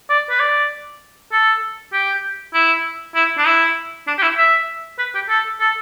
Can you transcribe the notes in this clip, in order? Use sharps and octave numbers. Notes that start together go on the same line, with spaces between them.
D5
B4
D5
A4
G4
E4
E4
D4
E4
D4
G4
E4
E5
B4
G4
A4
A4